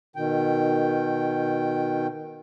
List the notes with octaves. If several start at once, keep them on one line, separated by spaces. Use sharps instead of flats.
B2 D#3 G5